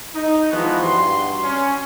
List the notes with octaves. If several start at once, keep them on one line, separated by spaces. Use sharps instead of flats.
D#4
E3 F3 G#3 B3 F#4
G2 F#4 C6
C#4